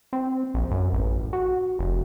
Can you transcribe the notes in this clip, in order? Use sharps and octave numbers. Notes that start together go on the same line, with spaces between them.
C4
A#1
F#2
A1
F#4
F1